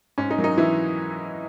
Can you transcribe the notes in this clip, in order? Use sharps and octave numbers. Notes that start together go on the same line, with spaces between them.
G#2 C#4
D#4
F#3 A#3
D#4
E3 E4